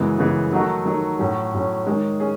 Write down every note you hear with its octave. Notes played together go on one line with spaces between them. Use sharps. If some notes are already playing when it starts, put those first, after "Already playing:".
Already playing: F#2 C#3 E3 G#3 B3
F#2 C#3 E3 G#3 B3
D#3 F#3 A3 D#4 F#4
D#3 F#3 A3 D#4 F#4
A2 F#3 C#4
A2 F#3 C#4
D#3 G#3 C#4 G#4
C#4 G#4